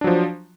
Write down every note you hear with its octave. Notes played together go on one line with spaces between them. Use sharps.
F3 F#3 D4